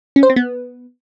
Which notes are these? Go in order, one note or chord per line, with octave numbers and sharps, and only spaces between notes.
C#4
C5
C4
B3